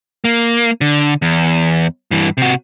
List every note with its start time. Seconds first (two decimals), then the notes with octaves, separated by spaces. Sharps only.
0.24 A#3
0.81 D3
1.22 E2
2.11 G2 E3
2.38 C3 F#4